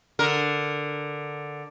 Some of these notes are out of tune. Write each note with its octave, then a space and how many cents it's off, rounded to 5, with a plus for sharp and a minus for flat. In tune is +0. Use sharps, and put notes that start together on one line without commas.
D3 +0 A#4 +0